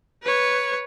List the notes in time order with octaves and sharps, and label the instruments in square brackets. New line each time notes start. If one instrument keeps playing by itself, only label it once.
[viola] B4 C#5